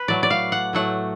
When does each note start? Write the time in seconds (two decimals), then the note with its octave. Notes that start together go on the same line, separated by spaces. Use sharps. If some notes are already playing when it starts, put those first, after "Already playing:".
Already playing: B4
0.08 A2 F#3 A3 D5
0.23 D5
0.30 F5
0.52 F#5
0.73 A2 F#3 A3 F#5